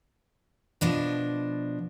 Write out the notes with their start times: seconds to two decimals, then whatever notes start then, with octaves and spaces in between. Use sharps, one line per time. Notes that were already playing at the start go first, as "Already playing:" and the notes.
0.81 B2 F3 D4 D#5